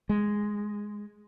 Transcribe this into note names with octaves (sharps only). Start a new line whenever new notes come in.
G#3